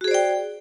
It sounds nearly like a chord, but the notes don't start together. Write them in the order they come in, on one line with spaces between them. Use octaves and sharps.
F#4 G#4 C5 D5 G5